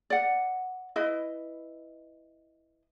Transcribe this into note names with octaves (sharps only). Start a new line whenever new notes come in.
D5 F#5
E4 B4 D#5